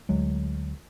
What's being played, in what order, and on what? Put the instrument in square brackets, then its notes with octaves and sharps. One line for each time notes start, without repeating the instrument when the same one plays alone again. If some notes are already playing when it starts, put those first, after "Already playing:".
[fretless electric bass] D2 F#3 G#3